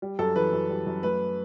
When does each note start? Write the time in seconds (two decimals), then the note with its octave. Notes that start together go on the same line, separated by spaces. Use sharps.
0.02 G3
0.19 F#2 A4
0.36 E3 B4
0.53 F#2
0.69 G3
0.87 F#2
1.03 A3 B4